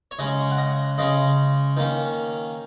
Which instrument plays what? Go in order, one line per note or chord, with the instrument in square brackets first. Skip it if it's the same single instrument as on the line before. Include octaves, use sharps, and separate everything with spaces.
[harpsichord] C#5
C#3 G#3 C#4 D#5
F#5
D#5
C#3 G#3 C#4 D#5
D#3 A#3 C#4